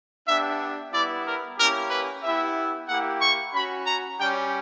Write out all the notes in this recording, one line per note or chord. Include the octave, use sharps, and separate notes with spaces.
B3 D4 G4 E5
G3 B3 E4 D5
A#4
A#3 C#4 E4 G4 A#4
B4
B3 E4 G4 E5
A#3 E4 G4 F#5
C#6
C#4 F#4 B5
A#5
G3 C#4 G4 G5